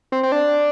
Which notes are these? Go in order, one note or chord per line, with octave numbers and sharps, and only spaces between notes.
C4
C4
D4